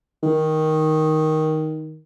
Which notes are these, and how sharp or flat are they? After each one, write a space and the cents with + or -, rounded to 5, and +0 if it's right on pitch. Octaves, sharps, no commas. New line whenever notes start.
D#3 +5